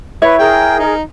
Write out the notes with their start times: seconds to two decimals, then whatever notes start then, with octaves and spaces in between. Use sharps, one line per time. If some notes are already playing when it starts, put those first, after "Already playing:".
0.22 E4 B4 C#5 E5
0.39 G#4 A#4 G5
0.79 D#4